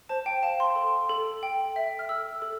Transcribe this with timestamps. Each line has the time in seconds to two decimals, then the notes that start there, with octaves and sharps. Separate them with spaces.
0.09 C5 A5
0.26 G5
0.43 F5 A5
0.60 C6
0.76 A4
1.09 A4
1.43 G5
1.76 E5
1.99 F6
2.09 A4 E6
2.42 A4 E6